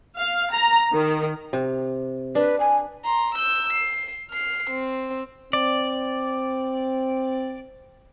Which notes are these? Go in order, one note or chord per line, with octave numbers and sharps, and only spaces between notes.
F5
A#5
D#3
C3
D4 B4
G#5
A#5 C6
E6 G6
C7
F6 C7
C4
C4 D5